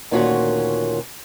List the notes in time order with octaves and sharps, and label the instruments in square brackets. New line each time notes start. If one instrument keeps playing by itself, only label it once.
[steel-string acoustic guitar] D2 A#2 D#3 C#4 F4 F#4